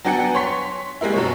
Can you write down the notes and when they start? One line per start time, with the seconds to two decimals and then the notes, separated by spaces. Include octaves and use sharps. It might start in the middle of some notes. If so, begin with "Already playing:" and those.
0.05 F#3 B3 D4 G5 G#5 C#7
0.35 C#5 C6 B6
1.01 G3 G#3 A#3 E4
1.14 F#2 B2 C#5